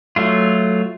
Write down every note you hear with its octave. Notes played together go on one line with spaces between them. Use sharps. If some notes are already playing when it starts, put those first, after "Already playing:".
F#3 A3 F4